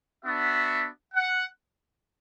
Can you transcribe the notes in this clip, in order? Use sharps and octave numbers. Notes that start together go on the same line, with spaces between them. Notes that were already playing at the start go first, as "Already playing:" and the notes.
B3 D4 F#4 E5
F#5